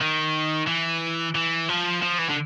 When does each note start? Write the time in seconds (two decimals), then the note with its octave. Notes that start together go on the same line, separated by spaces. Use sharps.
0.01 D#3
0.67 E3
1.35 E3
1.69 F3
2.02 F3
2.18 E3
2.30 D3